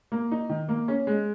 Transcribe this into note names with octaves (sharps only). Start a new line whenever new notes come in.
A#3
D#4
D#3
A#3
C#4
G#3